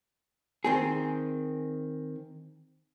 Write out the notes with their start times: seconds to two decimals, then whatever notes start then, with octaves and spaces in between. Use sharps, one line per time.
0.64 D#3 C4 G#4